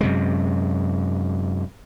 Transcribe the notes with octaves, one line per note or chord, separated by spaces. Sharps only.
F#2 C3 G#3